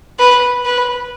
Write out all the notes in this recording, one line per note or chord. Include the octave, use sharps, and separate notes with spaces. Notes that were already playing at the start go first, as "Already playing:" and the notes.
B4
B4